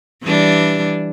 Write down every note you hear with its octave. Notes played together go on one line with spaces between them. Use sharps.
E3 G3 D4